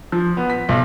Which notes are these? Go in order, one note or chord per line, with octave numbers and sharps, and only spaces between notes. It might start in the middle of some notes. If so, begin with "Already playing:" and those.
F3
B3
B6
B1